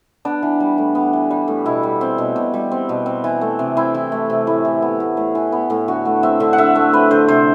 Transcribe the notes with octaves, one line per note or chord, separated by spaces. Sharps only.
B3 D4
E3
G3
A2
B3
E3
G3
A2
B2 E4
G3
C4
B2
B2
G3
C4
B2
C4
E3
A3
C3
C4 E4
E3
A3
C3
A2 E4
E3
B3
A2
A2
E3
B3
A2
D3 F#4
A3
C4 E5
D3 E5
F#5
D3 E5
A3
C4 B4
D3 C5
C3 C5